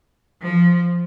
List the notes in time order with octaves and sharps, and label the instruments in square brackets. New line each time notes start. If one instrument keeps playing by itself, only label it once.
[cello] F3